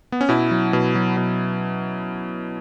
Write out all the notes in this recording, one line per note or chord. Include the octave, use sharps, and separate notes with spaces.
B3
C#4
B2 E4
F#3
B2
F#3
B2